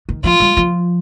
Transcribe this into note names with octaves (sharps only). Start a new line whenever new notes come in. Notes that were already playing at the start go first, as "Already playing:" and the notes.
D#3
F3 F4
G3
F3